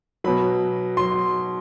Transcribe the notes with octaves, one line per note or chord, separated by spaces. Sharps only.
B2 F#3 B5
F#3 C6